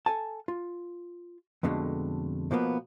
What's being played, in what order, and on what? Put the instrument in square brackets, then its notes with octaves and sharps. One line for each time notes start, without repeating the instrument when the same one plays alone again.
[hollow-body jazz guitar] A4 G#5 A5
F4
F2 B2 D3 G#3 A3
B2 F3 A#3 B3